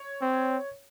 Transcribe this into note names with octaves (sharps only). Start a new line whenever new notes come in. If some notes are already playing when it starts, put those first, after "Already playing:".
Already playing: C#5
C4